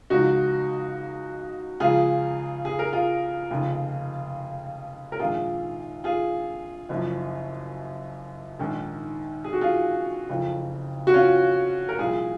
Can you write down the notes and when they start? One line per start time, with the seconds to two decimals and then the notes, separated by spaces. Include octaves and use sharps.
0.10 C#2 C#3 F3 D#4 F#4
1.80 C#2 C#3 F3 F4 G#4
2.65 G#4
2.79 A#4
2.93 F4 G#4
3.50 F1 D#2 C#3 F3
5.12 A#4
5.19 A#1 G#2 D#3 F4 G#4
6.04 F4 G#4
6.89 F#1 F#2 F3
8.59 A#1 G#2 D#3
9.44 G#4
9.53 F#4
9.61 F4 G#4
10.29 F#1 F2 C#3 F3
11.07 F#4
11.14 C#4 F4
11.89 A#4
11.99 C2 A#2 F3 F4 G#4